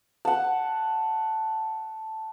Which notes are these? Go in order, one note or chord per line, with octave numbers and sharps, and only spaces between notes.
F#5 A5